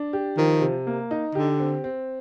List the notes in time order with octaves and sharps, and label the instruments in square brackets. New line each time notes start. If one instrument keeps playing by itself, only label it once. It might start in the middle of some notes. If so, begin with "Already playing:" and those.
Already playing: [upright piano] D4
G4
[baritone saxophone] D#3 [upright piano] F3
[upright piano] C3
A#3
D#4
[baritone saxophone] D3 [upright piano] G4
[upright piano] C4
C4